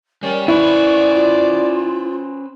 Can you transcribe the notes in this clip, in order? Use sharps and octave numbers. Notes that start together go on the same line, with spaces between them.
G3 C#4 A#4 D5
C#4 E4 B4 C5 D5 C#6
F4